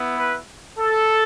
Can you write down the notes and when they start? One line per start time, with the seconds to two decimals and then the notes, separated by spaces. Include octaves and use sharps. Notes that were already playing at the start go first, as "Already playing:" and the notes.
Already playing: B3 E4
0.16 B4
0.79 A4